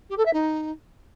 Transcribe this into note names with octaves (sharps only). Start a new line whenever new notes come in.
G4
A4
E5
D#4